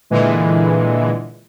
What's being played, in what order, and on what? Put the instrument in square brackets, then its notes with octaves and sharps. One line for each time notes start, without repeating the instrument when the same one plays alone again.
[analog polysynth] A#2 D3 E3 G#3